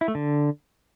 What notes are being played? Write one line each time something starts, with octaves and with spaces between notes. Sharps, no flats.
E4
A3
D3